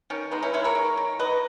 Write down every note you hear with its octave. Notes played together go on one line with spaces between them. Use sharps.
D#3 C#4
G#3 B3 D#4
C#4 E4
G#3 C#4 E4
A#4 C#5
D#3
D#3
F#3 B4 D#5